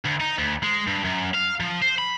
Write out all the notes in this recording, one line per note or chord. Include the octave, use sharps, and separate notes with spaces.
D2
D#4
D2
G#3
G2
F#2
F5
F3
C5
B5